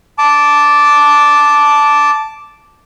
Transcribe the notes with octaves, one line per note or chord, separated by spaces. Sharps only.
A5 D6